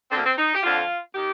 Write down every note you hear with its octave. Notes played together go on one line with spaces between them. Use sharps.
D2 D3 A#3 C4
C4
D#4
G4
F2 D3 F4
D#3 G4